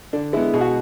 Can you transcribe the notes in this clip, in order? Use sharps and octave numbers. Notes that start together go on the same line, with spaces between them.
D3 D4
G#3 B3 E4
B2 G#4
F#4